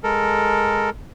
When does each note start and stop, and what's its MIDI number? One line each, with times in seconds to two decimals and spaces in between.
0.03 0.90 56
0.03 0.90 69
0.03 0.90 70